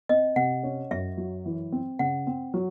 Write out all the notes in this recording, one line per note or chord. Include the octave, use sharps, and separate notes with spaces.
C4 D#5
C3 F#5
C#4
F#2 E5
F#3
E3
C4
C#3 F#5
C4
F#3